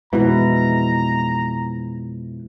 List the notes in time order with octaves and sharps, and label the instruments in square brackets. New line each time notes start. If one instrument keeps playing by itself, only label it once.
[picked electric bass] F2 B2 E3 [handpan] G#3 E4 [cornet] A#5